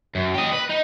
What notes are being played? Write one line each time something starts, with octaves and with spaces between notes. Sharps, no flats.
F#2
G4 D#5
B4
D#4